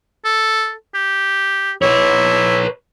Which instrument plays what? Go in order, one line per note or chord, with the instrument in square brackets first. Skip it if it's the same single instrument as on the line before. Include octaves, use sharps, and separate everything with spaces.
[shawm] A4
G4
[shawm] E4 [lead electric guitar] B4 C#5